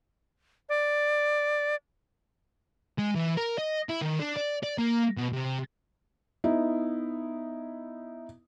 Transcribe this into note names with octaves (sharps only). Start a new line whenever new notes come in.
D5
G#3
E3
A#4
D#5
E4
D#3
D4
D5
D5
A#3
B2
C3
B3 D#4 E4